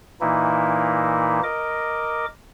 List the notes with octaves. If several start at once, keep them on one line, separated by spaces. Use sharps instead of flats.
A#2 E3 A#3 D#4 E4
A#4 D#5 D6